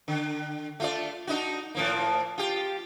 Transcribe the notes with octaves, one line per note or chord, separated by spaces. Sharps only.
D3
A3 F4 D5
D4 D#4 F#4
A2 F3 A#3
F4 G4